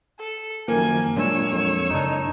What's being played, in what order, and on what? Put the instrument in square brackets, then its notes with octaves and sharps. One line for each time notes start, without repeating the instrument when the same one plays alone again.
[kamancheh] A4
[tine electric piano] F#2 D#3 F3 [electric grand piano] A#3 [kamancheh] G#5
[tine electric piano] A#2 [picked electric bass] F#3 G#3 D4 [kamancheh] C#5 E6
[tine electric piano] F2
[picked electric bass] F#2 C#3 [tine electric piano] D4 D#4